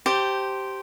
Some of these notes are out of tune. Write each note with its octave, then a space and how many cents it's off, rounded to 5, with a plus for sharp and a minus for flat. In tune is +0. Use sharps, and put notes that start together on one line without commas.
G4 -10 C5 +0 A5 +15